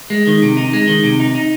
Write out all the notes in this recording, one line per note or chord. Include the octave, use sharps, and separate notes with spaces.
G#3
D#3
C3
D#4
G#3
D#3
C3
D#4
D#4